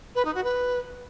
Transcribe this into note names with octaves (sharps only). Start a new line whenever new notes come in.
B4
D#4
F#4
B4